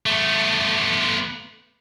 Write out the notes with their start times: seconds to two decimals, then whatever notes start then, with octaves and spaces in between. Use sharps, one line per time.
0.06 A3 B3